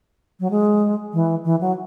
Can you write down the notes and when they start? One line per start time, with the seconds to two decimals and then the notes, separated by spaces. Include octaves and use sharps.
0.40 F#3
0.51 G#3
1.13 E3
1.45 E3
1.61 F#3